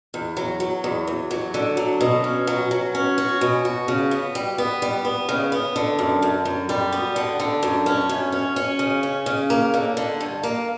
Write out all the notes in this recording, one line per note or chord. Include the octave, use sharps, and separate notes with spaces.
E2
F#3
F#3
E2
E2
F#3
D3
F#3
B2
C#4
F#3
F#3
C#4
F#4
B2
F#4
C#3
B3
G3
B3
G3
B3
C#3
B3
D3
F#2
F#2
F#2
G3
B3
D3
D3
F#2
C#4
F#2
C#4
C#4
C#3
C#4
C#3
A#3
D3
D3
G2
A#3